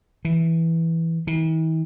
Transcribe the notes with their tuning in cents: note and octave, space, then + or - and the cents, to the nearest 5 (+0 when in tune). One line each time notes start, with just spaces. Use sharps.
E3 -5
E3 -45